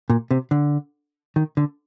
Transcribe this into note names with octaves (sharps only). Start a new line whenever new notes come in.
A#2
C3
D3
D#3
D3